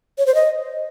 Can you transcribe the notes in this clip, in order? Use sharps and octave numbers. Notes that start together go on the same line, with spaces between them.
C#5
C5
D#5